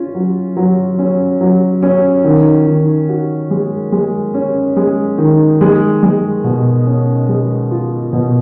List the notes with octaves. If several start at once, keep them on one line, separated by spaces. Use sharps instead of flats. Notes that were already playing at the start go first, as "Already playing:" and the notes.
Already playing: C#4 F4
F#3
F#3
C#4
F#3
C#4
D#3
D#3
F#4
G#3
G#3
C#4
G#3
D#3
G#3
G#3
B2
C#4
G#3
F4
B2